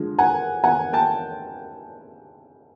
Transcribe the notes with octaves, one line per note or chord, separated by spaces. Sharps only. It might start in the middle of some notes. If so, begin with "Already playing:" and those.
Already playing: D3 F3 G#3
F#5 G#5
F#5 G#5
G5 A5